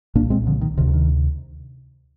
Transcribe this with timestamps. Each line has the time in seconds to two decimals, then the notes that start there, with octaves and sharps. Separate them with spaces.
0.15 C2 A#2 A#3 D4
0.30 G#3 C4
0.47 D3 F3
0.61 D#3
0.77 C3 D#3
0.80 D2
0.88 D3
0.93 D#3